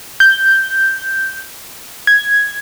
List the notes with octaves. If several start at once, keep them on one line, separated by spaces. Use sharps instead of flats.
G6
G#6